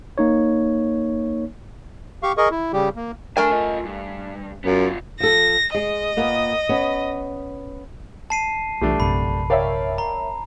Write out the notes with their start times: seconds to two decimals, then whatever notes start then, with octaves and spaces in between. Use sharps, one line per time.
0.18 A#3 D#4 C#5
2.23 G4 F5 C#6
2.37 G#4 A#4 D#5 C#6
2.51 E4
2.73 C#3 G3 G4
2.96 A#3
3.37 A3 D4 A#4 G#5
3.51 F4 D#5
3.85 G2
4.64 F#2 B3 F4
5.20 F3 A4 A#6
5.74 G#3 D#5
6.17 A#2 A#3 B3
6.69 B3 C#4
8.30 A5 C7 D#7
8.81 B1 E3 G3 A3 D4
9.00 A#1 F#2 C3 B5
9.50 A#4 C#5 D5 E5 F5 G5
9.98 A#5